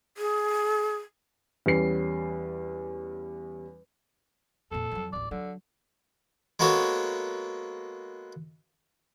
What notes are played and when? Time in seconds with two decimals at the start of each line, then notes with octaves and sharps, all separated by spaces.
0.18 G#4
1.66 E2 G3 C#4 C7
4.71 F2 A#2 A4
4.91 F2 F#3
5.13 D1 A1 D5
5.31 D3 F#3
6.59 G#3 A#3 B3 F#4 A4 C#5